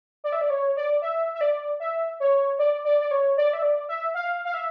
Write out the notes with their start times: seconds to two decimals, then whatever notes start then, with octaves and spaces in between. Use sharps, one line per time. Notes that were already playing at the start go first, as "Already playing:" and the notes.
0.24 D5
0.32 E5
0.41 D5
0.50 C#5
0.77 D5
1.02 E5
1.35 E5
1.41 D5
1.80 E5
2.20 C#5
2.59 D5
2.85 D5
3.01 D5
3.11 C#5
3.37 D5
3.53 E5
3.62 D5
3.89 E5
4.15 F5
4.45 F5
4.54 E5